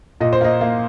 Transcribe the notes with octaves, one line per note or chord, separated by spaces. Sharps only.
A#2 D#5
C5
A#3 D#5
A#3